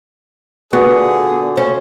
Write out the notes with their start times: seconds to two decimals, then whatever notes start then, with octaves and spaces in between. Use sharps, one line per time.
0.73 A#2 D3 B3 F#4 G#4
1.57 C#4 C5